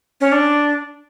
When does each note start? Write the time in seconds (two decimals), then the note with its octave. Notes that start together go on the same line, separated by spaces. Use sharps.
0.21 C#4
0.32 D4